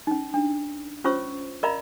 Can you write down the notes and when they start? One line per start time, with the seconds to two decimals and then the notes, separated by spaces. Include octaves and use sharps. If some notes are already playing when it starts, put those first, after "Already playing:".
0.07 C#4 D#4
0.34 D4
1.04 C#4 F4 C5 C#5 C#6 E6
1.63 A#4 D5 D#5 F5 A#5 B5